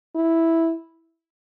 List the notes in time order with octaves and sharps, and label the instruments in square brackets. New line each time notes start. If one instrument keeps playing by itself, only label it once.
[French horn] E4